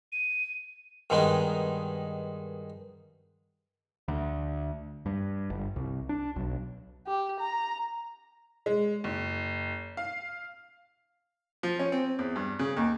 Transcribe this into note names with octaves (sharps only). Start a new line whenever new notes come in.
D#7
G2 D#3 G#3 B3 D#4
D2
G2
G1
C2
D4
B1
G4
A#5
G#3
F#1
F5
F3
C#4
C4
E2
G2
C#3
D#2